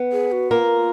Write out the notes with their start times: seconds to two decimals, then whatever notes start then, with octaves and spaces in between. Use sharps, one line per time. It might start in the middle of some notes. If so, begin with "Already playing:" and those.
Already playing: B3 B4
0.12 G#4
0.32 F#4
0.51 A#3 F4 A#4